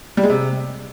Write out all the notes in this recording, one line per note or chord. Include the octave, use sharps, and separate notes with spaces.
G3
G#3
C3